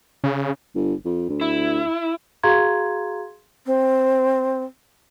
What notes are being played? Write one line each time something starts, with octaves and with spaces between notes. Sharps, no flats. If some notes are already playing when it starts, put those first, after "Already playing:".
C#3
G1
F2
D2
E4
F#4 G#4 F5 A#5 C6 G#6
C4